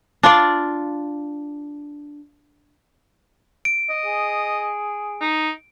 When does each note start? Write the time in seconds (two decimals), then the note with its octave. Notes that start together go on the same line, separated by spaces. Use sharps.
0.23 D4 F4 D5
3.65 D7
3.90 D#5
4.06 G#4
5.21 D#4